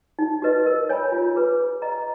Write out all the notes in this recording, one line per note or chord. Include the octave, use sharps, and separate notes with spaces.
D#4
F#4 B4 D#5
A#4
C#5 G#5 B5
F4
G#4 B4
G#4
D#5 A#5